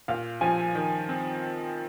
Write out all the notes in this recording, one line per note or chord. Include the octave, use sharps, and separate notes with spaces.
A#2 F5
F3 G#5
D#3
C4